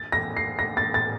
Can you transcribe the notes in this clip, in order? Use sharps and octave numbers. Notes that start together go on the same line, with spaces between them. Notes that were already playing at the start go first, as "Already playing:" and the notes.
Already playing: A6
A#6
C7
A#6
A6
A6